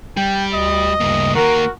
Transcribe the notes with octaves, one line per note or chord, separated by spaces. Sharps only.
G3 G5
D2 D#5
D2 G2 C#3 A#3
D#3 A#3 F#4 A#4